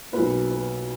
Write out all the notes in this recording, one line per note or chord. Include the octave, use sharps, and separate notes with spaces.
B1 B2 A#3 B4
B4